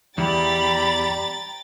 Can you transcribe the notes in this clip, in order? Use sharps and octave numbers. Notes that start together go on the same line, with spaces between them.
E2 G3 G5 A#5 B5 A6